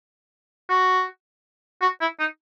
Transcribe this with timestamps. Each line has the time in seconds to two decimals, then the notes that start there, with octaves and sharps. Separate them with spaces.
0.70 F#4
1.82 F#4
2.01 E4
2.20 D#4